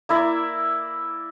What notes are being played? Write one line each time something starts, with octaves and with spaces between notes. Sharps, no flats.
A#3 E4 D5 E5